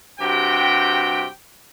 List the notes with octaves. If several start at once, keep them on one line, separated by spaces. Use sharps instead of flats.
G2 C3 F#4 G4 G5